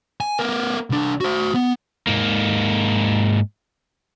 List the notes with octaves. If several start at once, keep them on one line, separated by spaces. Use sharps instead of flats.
G#5
B3 A#4
C2 D4
F#4 C5
B3
G#2 A#3